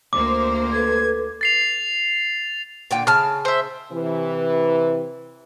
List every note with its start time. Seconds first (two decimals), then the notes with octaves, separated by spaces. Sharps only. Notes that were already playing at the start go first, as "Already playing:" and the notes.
0.13 D2 A#3 C5 D6
0.72 A4 B4 G#6
1.41 A6 C7 F7
2.91 A#2 D3 G5
3.07 C#3 A5 F6
3.45 C5 E5
3.92 C3 E3